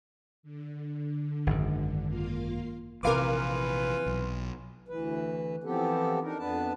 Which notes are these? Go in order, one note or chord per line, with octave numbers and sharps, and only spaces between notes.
D3
G#1 F#2
A#3 F4 F5
A#1 C3 E3 F4 A#4 B4 F5 D6
B1
D2 E3 B4
E3 F3 B3 C4 G4 A4
D4 D#4 A#4
F2 B3 D4 B4 A5